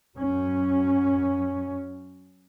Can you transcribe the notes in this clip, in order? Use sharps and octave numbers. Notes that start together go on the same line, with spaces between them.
F#2 F#3 C#4